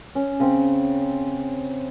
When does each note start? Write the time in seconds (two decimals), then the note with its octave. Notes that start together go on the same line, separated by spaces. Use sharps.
0.15 C#4
0.40 C#3 C4